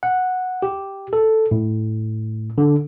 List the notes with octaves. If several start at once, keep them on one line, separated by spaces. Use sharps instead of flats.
F#5
G4
A4
A2
D3